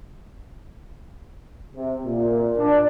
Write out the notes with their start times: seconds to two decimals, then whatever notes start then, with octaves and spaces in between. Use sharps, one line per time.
1.76 C3
2.05 A#2
2.57 D4